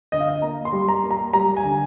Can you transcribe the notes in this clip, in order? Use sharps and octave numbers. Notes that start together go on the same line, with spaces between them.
D3 D#5
F5
D#5
A#3 A#5
C6
G3
A#5
A#3
A#5
G3 A#5
G#5
D3